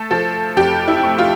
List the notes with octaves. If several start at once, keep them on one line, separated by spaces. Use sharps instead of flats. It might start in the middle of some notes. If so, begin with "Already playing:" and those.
Already playing: A3 A4
F3 A4
F2 G4
E4
A3
F4